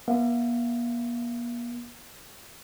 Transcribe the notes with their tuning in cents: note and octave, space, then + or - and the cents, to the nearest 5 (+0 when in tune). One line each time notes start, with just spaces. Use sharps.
A#3 +45 E5 +40